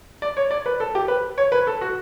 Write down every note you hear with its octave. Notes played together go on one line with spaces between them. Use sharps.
D5
C#5
D5
B4
A4
G4
B4
C#5
B4
A4
F#4